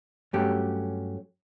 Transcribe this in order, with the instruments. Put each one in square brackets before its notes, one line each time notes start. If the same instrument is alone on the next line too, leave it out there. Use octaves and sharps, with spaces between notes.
[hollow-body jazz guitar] G2 F#3 A3 C#4 G4